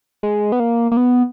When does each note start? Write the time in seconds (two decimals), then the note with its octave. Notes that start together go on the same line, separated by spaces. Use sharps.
0.23 G#3
0.52 B3
0.60 A#3
0.92 A#3
0.97 B3